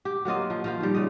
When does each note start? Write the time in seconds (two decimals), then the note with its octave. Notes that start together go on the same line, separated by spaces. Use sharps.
0.05 G4
0.25 F#3 A#3 F4 D#5
0.50 F3
0.64 F3 F4 C5
0.81 D#3 G3
0.95 C#3 D#5